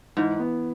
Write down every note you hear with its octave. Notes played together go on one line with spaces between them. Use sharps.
G#2 E3
B3